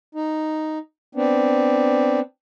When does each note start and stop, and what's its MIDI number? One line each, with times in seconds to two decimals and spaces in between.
0.15 0.78 63
1.15 2.20 59
1.15 2.20 60
1.15 2.20 62